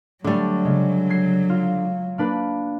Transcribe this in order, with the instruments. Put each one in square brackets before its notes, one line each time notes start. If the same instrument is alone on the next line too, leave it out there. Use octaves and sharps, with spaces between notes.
[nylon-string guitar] D3 G3 [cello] F#3 [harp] A3 D6
[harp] C#3 G#3
G#6 C7
F4
A#3 D4 B4